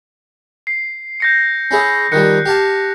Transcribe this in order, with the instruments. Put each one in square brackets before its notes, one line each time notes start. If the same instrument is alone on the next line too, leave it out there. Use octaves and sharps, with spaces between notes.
[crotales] C7
G6 A#6 C#7
[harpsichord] C#4 E4 G#4
[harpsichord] D#3 F3 G3 [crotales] F#6 C#7
[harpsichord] G4 F5 A5